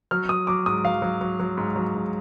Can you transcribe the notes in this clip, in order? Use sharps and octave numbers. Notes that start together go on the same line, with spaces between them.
F#3 F6
F#3 D#6
F#3 D6
G#2 D#6
F#3 F5
F#3
F#3
F#3
G#2
F#3
G#2